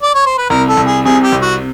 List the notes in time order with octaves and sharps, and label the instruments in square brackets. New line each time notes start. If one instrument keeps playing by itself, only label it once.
[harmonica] D5
C#5
C5
B4
[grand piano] C2 [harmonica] A#4
[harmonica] A4
[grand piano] C2
[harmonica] G#4
[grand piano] C3 [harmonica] G#4
[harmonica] G4
[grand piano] C2
[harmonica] F#4